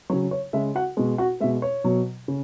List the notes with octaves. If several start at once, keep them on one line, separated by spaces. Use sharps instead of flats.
C#3 F#3 C#5
C#5
C#3 G#3 E5
F#4 F#5
B2 G#3
F#4 F#5
B2 G#3 E5
C#5
B2 F#3
C#3